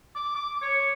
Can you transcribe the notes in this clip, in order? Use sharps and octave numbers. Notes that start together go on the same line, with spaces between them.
D6
D6
C#5